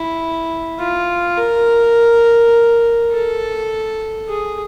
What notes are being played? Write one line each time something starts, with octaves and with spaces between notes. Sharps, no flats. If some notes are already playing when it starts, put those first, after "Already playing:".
Already playing: E4
F4
A#4
A4
G#4